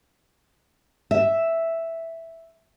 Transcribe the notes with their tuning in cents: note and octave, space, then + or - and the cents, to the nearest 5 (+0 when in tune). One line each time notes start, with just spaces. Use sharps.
E5 +0